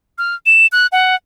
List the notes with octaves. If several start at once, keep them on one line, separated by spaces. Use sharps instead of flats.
F6
E7
F#6
F#5